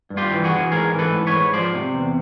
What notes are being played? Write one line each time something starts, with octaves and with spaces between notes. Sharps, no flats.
G2
F4 G4
E3
F#4 G#4
E3
G#2 G#4 A#4
E3
A4 B4
G#2
B4 C#5
G#2
F3 C5 D5
C3
E2